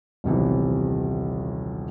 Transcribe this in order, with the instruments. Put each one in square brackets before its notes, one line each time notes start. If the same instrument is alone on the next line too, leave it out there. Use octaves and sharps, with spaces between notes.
[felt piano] D#1 B1 C3 E3